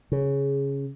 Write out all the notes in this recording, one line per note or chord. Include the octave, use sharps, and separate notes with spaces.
C#3